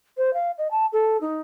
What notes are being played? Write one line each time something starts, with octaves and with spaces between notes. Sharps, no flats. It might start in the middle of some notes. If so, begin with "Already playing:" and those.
C5
F5
D#5
A5
A4
D#4